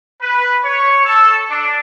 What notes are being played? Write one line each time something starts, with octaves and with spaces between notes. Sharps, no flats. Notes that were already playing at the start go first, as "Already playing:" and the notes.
B4
C#5
A4
D4